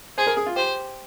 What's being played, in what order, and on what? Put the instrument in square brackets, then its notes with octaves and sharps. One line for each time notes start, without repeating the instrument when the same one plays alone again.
[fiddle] G#4 [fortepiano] C5
[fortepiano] A#4
G#4
F4
[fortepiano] G4 [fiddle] C5